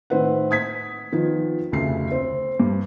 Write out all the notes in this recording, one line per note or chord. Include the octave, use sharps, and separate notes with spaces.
A2 D#3 C4 B4 F#5
D#6 G#6 B6
D#3 F3 B3
F1 D2 C#3 A3 C7
C4
G2